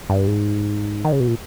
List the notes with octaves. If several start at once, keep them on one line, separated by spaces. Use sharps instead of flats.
G2
G#2
D#3
C#3
B2
A#2